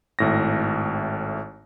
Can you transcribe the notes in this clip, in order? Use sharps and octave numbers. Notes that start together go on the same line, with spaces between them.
G#1 A2 A#6